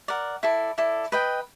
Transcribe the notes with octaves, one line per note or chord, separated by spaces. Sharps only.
A#4 D5 F#5
E4 A4 D5
E4 A4 D5
B4 D#5 G5